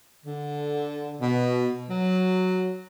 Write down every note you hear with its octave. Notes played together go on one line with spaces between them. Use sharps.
D3
B2
F#3